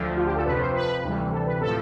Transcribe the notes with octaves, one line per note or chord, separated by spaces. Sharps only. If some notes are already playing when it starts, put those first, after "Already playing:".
Already playing: D2 D3 F3
F4
G4
A4
F2 C3 F3 B4
C5
B4
D2 C3 E3 G3
A4
B4
A2 F3 A4